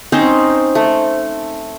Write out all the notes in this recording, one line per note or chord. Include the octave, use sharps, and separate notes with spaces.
C4 C#4 D#4 C5
A3